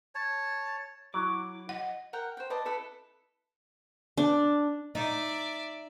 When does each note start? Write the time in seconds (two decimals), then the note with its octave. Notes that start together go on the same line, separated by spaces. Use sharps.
0.15 C#5 A5
1.14 F#3 E4 D6
1.69 D#5 F#5
2.13 A#4 F#5 G5
2.37 C5 G5
2.50 B4 D5 D#5 A5
2.65 E4 A4 B4
4.17 D4
4.95 D#4 D5 E5